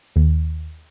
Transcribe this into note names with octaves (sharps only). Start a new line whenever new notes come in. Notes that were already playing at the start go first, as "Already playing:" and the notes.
D#2